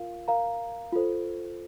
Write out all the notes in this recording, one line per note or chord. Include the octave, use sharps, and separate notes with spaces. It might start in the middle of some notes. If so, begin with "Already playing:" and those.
Already playing: F4 A#4 F5
A#4 F5 A#5
F4 A4 C5